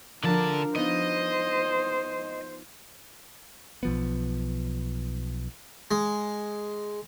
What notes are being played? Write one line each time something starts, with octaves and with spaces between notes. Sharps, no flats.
D3 F3 D4 A#4 A5
B3 D#4 F4 C5 D#5
B1 F3 B3
G#3